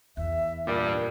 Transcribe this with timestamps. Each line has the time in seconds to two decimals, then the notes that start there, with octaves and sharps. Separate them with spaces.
0.17 E2 E5
0.67 G2 A#2 G3 G4 A#4 D5